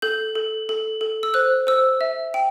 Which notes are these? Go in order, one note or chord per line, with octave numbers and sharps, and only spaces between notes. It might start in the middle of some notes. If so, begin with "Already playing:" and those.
A4 G6
A4
A4
A4
E6
C5 F#6
C5 E6
E5
G5